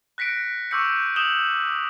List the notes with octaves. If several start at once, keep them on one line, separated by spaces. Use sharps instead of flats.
F#6 A#6 B6 C#7 D7
C#6 D6 E6 G6 C#7
D#6 G6 E7 F#7 G7